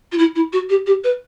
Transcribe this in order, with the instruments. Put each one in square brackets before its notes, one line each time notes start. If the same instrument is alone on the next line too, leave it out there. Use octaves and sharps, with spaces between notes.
[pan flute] F4
E4
E4
F#4
G4
G4
B4